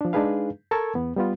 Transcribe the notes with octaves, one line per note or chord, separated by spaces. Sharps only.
F3 D4
G#3 D4 D#4 G#4 B4 F5
A4 A#4 A5 C#6 E6 G#6
E2 B3
G3 B3 F4